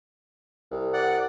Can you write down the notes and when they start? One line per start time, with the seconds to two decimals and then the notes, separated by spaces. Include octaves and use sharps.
0.71 C2
0.94 D5 F#5